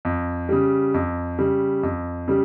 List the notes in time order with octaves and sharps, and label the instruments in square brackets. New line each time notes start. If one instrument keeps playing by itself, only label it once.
[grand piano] F2
C#3 G3
F2
C#3 G3
F2
C#3 G3